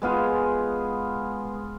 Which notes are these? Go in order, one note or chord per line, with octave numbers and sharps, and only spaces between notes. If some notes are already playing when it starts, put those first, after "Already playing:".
G#3 B3 F4 G#4